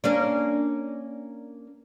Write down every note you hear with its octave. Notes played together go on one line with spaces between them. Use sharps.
A#3 C#4 D4